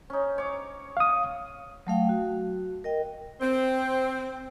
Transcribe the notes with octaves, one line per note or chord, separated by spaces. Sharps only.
C#4 D#4
C#5 D6
F5 D#6
F#3 A3 F5 G5
F#4
A#4 D#5 G5
C4